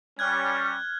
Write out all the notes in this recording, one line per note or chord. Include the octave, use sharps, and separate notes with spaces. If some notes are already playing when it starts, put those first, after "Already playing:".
G3 C#4 F6 F#6 G#6